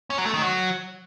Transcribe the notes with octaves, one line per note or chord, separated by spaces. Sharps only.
C#4
F#3
A3
D#3
F#3